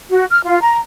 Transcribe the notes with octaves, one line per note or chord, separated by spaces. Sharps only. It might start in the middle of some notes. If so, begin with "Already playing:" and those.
F#4
F6
F4
A#5